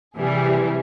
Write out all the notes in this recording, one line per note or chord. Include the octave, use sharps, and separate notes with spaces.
C3 E3 G3 G#4